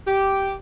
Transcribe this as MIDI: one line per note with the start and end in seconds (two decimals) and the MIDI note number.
0.07 0.54 67